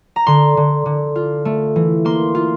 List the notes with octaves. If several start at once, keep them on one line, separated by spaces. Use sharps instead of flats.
A#5
D3 C6
D3
D3
F4
A3
E3
A#3 C6
F4